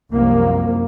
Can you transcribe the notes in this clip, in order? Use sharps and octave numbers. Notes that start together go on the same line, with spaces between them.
C2 F#2 F3 A#3